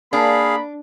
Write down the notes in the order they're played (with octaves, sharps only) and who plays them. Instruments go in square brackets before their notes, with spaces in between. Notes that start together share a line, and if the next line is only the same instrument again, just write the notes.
[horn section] A#3 B5 [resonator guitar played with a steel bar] D4 [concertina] G#4 F5